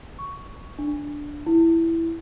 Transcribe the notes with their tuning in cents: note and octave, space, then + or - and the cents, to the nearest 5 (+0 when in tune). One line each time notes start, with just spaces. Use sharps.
C#6 +10
D4 -5
E4 +5